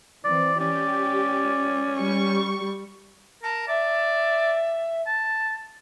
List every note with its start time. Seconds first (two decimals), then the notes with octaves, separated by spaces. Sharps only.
0.25 E3 C4 D5
0.60 C#4 G4 D5
1.98 G3 C#6
3.43 A#4 A5
3.68 D5 E5
5.07 A5